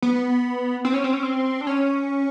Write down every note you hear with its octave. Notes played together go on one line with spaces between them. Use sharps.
B3
C4
C#4
C4
C#4
C4
D4
C#4